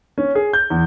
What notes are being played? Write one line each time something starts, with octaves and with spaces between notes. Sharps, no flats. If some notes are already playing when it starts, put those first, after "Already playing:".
C#4
G#4
G6
E2